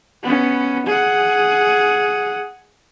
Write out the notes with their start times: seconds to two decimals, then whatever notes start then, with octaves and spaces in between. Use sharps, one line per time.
0.23 B3 C#4
0.87 G#4 F#5